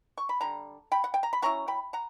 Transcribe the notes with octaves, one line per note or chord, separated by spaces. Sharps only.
C#6
B5
D3 G3 A#5
G5 B5
F#5
G5
A#5
B5
F#3 C#4 E4 A#5 C#6
G5 B5
F#5 A#5